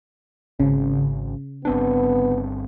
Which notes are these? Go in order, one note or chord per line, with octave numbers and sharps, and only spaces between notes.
G#1 C#3
G1 B3 C4 D4